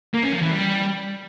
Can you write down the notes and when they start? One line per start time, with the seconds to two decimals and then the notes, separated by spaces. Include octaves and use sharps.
0.14 A#3
0.23 C#4
0.33 F3
0.42 E3
0.51 G3